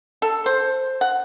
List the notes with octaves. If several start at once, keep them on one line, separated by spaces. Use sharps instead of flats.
A4
C5
F#5